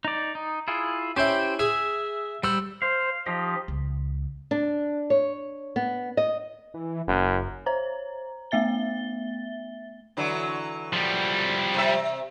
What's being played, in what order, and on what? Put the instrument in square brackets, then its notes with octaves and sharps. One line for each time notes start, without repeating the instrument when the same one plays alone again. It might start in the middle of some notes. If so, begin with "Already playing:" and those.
[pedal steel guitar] D#4 D5
D#4
E4 F4 G#4
[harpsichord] C#4 E4 [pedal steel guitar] G4 C5 G5
[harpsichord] G#4 [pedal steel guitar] E5
[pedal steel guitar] G3 E6 [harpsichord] C5 F#5
[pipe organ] C5 [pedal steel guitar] F5
[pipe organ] F3 [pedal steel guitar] D#4 G4 D#5
[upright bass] C#2
[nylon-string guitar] D4
C#5
B3
D#5
[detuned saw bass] E3
[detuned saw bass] F#1 [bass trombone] F#2
[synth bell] C5 C#5 A#5
A3 B3 E5 A6 G7
[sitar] D3 E3 F#3
[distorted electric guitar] F3 G3
[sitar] C3 E5